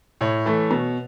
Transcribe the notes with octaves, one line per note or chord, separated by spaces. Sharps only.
A2 C#5
E3 A3
B2